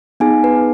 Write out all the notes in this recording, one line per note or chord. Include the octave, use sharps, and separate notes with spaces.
B3 D#4 G#4 G#5
B4